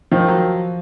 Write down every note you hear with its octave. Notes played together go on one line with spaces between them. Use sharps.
D#3 F3
F#3